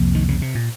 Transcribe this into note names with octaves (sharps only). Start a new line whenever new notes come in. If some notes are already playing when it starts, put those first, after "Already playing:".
Already playing: C2 F2 C3 F3 A#3
D#3
C#3
C3
A#2